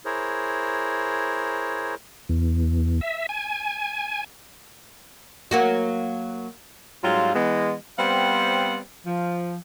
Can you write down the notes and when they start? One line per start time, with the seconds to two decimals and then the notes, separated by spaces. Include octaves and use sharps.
0.05 E4 G#4 A#4 C5 C#5
2.29 E2
3.01 E5
3.29 G#5
5.51 F#3 A#3 F#4
7.04 G#2 F#3 G3 C4 F4
7.35 E3 G#3 B3
7.99 G3 B3 C4 C5 F5 F#5
9.06 F3